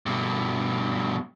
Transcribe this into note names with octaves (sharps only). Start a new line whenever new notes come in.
G2 B2